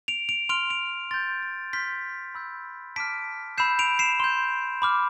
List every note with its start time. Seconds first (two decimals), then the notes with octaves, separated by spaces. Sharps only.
0.08 D7 F7
0.29 D7 F7
0.49 C6 F6 D7 F7
0.70 D7 F7
1.11 C6 G6 A6
1.42 A6
1.73 C6 F6 G6 B6
2.35 B5 E6 G6
2.96 A5 D6 F6 B6 D7
3.58 B5 E6 G6 C7 E7
3.79 D7 F7
3.99 C7 E7
4.20 C6 G6
4.82 B5 D6 F6